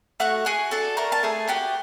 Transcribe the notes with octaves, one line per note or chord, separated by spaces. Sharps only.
A3 F#4 F#5
F#4 G#4 G#5
D4 A4 A5
A3 A#4 A#5
A5
A3 G#4 G#5
F#4 G4 G5